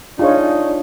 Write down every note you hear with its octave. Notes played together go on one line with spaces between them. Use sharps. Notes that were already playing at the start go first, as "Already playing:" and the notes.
D4 D#4 F4 G#4 C#5